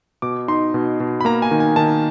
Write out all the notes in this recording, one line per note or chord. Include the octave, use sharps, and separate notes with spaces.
B2 D6
D#4 C6
B2
B2
B5
A#3 A#5
G#5
D#3
G#5
D#3 A5